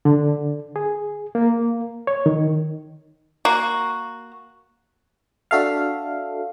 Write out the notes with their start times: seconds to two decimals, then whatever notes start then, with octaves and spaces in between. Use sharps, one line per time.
0.05 D3
0.76 G#4
1.35 A#3
2.07 C#5
2.26 D#3
3.45 A#3 F#4
5.51 D4 F#4 A4 E5 F5